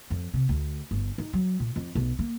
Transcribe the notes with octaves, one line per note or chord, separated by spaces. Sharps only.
F2
C3
D2
G1
D#4
F#3
A#2
F2
B1
A#3